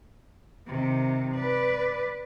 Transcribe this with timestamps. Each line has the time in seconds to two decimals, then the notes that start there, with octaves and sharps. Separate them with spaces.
0.67 C3 D#3
1.35 B4 D5